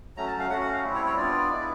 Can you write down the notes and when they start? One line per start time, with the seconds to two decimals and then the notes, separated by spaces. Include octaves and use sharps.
0.16 F#3 A3 C#4 A#5
0.27 A5
0.40 F5
0.50 A3 C#4 F#4 F#5
0.61 F#5
0.73 F5
0.83 G3 C4 E4
0.95 C#5
1.06 C#5
1.17 B3 D4 F4 D5
1.51 G#3 B3 E4